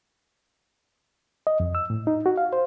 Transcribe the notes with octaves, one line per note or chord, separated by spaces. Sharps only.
D#5
F2
E6
A2
D#4
F#4
F5
C5